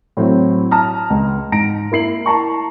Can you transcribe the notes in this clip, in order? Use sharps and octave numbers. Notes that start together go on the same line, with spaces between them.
A2 F#3 C4
A5 A#5 D#6 F6
C#2
G#2 A#5 A#6 D7
A#3 E4 C7 F#7
A5 A#5 C#6